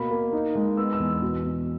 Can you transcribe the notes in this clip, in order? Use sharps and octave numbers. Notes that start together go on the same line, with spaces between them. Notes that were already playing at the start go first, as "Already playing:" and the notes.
Already playing: B2 A#3 B5
A#3
D#4
G#3
B3 E6
E6
E2
B2
B2